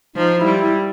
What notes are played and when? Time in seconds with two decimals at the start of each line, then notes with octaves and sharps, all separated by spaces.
0.16 F3 D#4
0.38 E4
0.45 G3
0.60 E4